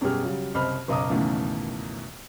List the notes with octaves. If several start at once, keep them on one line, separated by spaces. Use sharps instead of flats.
F#2 B2 G3 G4 G#4 F6
C#3 F#3 G3
F#1 C2 C5 D#5 B5 F6
F#1 B1 D#5 A#5 D6 D#6
C#2 F#2 B2 D#3 E3 A3